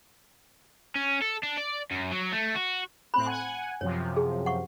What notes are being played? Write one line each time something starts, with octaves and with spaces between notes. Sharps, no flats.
C#4
A4
D4
D5
F#2
F#3
A3
F#4
A2 C4 B5 F#6
F#5 G#5 C6
F#2 C3 F3 C#5
G#4
F#5 C#6